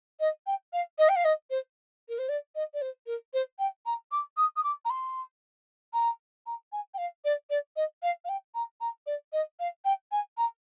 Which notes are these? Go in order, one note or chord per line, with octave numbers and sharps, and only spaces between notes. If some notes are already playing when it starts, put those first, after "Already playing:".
D#5
G5
F5
D#5
G5
F5
D#5
C5
A#4
C5
D5
D#5
D5
C5
A#4
C5
G5
A#5
D6
D#6
D#6
D6
A#5
C6
A#5
A#5
G#5
G5
F5
D5
D5
D#5
F5
F5
G5
A#5
A#5
D5
D#5
F5
G5
G#5
A#5